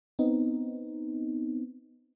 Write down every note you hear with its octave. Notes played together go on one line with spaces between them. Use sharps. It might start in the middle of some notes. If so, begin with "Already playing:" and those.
B3 C4 D#4